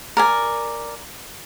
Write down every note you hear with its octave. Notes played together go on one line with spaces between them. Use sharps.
A#4 D5 G#5